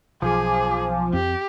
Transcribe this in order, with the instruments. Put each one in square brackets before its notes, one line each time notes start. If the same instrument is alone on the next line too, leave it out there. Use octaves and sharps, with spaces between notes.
[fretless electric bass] B1 [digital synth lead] F3 [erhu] G#4 [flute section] G#5 D6
[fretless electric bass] F2 C4 [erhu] G4